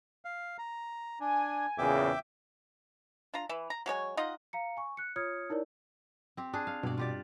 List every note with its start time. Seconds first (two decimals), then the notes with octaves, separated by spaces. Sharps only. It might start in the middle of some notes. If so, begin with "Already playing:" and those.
0.25 F5
0.59 A#5
1.20 D4 G#5
1.78 E2 A#2 C#3 E5 G5 D6
3.34 D4 F4 A#5
3.49 E3 E4
3.70 A#5
3.86 F#3 G#3 C#5 G#5
4.17 D#4 F4 D#5 F#5
4.53 F5 A#5 C#7
4.77 G#5 C#6
4.97 F#6 C#7
5.16 F4 C#5 D#6 F6 G#6 C#7
5.50 D#4 E4 A#4 C#5 D5
6.37 C4 G4
6.53 D4 G#4
6.67 F5
6.83 G2 B2 D5
6.98 F4 G4 D5